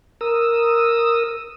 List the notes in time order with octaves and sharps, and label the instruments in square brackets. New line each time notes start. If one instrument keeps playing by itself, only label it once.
[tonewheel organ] A#4 D#6 E6